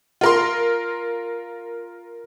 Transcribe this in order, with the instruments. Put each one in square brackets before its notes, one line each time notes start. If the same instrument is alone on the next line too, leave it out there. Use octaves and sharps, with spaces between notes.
[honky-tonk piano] F4 A#4 C6